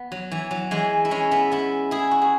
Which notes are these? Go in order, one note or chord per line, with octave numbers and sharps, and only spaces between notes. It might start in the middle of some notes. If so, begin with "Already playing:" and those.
Already playing: B3
F#3
E3
F#3
E3 G#3
E4
G#3 C#4
B3 E4
B3 E4
E4 G#4
F#4
G#4